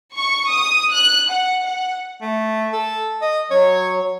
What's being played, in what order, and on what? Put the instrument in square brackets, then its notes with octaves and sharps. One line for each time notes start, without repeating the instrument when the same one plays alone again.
[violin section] C#6
D#6
F#6
F#5
F#5
[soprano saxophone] A3
A4
D#5
[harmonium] F#3 [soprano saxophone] C#5